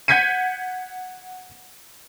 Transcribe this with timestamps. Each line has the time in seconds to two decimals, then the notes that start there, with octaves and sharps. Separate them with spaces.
0.08 F#5 G6 G#6 B6 C#7 D#7